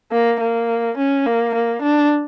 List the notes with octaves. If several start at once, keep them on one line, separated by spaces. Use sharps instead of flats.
A#3
A#3
C#4
A#3
A#3
D4